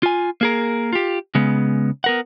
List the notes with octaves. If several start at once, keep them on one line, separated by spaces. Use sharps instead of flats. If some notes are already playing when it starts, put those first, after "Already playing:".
F4 G#5
A#3 G#4 A#4
F4 G4
C#3 G#3 B3
B3 A#4 F#5